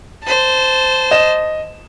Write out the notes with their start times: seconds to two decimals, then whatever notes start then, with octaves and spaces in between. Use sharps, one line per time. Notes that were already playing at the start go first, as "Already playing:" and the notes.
0.24 C5 A5
1.11 D#5 E7